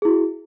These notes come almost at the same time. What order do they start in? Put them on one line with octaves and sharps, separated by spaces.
G#4 E4 F#4